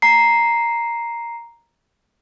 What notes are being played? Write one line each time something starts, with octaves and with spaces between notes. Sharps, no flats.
A#5 C7